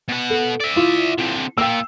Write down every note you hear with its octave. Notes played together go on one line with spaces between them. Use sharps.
B2 F#5
A4
D5 E5
E4 F4
D3 C4
A#3 F4 G5 E6